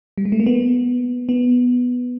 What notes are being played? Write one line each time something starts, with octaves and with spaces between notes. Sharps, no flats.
G3
G#3
A3
A#3
B3
B3